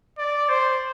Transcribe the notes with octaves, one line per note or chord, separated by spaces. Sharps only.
D5
C5